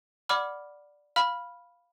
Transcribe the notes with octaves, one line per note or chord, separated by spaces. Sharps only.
D5 F#5 B5 D6 F6
F5 B5 F6